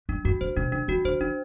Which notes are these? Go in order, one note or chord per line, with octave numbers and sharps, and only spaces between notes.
G2 D4
G2 F#4
G2 C5
B2 D4
C3 D4
E3 F#4
D3 C5
E3 D4